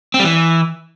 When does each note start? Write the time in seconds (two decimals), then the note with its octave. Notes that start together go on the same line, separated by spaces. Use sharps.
0.14 C4
0.19 G3
0.25 E3